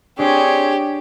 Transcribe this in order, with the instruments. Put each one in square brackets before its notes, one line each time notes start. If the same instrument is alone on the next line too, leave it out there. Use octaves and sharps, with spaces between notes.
[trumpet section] C4 G#4 C#5 [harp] D4 [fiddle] G4